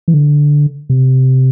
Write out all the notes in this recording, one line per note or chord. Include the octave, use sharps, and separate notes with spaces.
E3
D3
C3